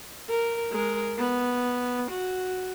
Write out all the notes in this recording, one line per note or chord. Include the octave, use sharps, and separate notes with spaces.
A#4
G#3 A#4
B3
F#4